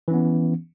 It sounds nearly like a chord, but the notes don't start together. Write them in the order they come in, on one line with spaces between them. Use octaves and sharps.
E3 C#4 B3